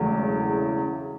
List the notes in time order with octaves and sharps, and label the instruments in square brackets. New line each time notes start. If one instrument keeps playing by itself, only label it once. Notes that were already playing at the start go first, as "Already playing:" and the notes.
Already playing: [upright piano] E1 E2 C#3 F#3 A3